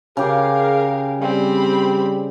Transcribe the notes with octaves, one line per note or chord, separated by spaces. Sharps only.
C#3 G4 G#4 A#4 F5
G3 C4 B5